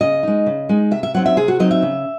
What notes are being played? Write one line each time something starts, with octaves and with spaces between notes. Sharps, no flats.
C#3 D#5
G#3 D#4
C#3
G#3 D#4
C3 E5
E5
F#3 C4 D#4 F#5
E5
C3 G#4
F#4
F#3 C4 D#4 D#5
E5
C#3